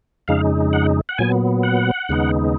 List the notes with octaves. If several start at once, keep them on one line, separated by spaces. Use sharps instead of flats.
F2 C#3 G#3 D#4 F5
F#5
F#5
A#2 F#3 B3 G#5
F#5
D#2 C#3 G#3 B3 D#4